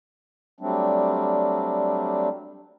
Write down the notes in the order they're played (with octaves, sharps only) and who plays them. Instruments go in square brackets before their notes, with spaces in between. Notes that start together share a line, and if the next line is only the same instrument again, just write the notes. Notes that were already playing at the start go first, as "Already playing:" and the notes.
[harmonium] F#3 G3 A3 C4 D4